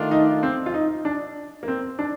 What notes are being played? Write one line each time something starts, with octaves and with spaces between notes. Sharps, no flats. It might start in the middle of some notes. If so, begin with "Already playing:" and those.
Already playing: D#3 A3 D4 F4
D#4
C4
F4
D#4
D4
A#3
C4
D4